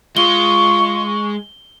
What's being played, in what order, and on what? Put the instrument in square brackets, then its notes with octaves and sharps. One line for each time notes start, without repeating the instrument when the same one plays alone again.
[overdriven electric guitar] G#3 [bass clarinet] F4 [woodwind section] C#6 [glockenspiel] G7